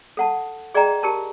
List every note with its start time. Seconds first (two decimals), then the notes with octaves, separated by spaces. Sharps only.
0.17 A4 F#5 A5
0.75 G#4 D5 D#5 G5 A#5
1.03 G4 A#4 A5